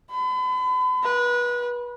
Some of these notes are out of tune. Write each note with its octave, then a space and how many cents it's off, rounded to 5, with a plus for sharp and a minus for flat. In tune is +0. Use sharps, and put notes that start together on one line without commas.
B5 +40
B4 -30